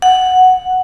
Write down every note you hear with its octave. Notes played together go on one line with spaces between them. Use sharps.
F#5